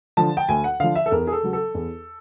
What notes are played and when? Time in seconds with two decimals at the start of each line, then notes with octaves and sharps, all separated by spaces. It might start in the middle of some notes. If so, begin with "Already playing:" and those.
0.17 D3 F3 A5
0.37 G5
0.49 D2 G#5
0.64 F#5
0.80 D3 F3 F5
0.95 E5
1.06 A4
1.11 E2 A#4
1.27 G#4
1.32 A4
1.43 C#3 F#3
1.53 A4
1.75 E2